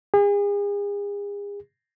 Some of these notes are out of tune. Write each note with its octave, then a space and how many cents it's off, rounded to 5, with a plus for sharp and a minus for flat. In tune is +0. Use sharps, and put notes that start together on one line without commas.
G#4 -40